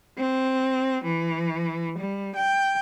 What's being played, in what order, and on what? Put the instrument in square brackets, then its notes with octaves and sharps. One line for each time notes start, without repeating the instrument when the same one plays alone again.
[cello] C4
E3
G3
G5